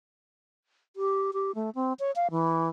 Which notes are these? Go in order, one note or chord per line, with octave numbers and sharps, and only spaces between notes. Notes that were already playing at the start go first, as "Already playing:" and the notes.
G4
G4
A3
C4
C#5
F5
E3